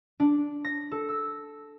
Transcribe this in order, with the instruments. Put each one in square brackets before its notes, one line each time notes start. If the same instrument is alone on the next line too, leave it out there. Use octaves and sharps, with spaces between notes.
[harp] D4
A#6
A4
E6